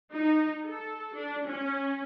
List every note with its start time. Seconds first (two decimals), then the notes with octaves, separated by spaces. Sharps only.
0.13 D#4
0.67 A4
1.15 D4
1.48 C#4